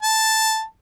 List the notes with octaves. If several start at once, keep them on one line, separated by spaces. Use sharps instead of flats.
A5